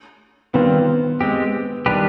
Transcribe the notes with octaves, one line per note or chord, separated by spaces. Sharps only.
D#3 G3 B3 C4 F4
G#3 C4 G4
D#3 G3 D4 G4 B4